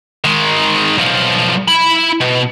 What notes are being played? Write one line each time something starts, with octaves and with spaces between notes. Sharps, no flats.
D#3 G#3
B1 F3
E4 B5
B2